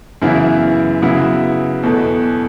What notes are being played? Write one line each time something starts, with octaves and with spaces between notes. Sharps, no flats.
F#2 C#3 E3 B3 E4
C#3 F#3 B3 E4
E2 B2 A3